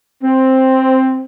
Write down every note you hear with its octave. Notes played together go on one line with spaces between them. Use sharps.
C4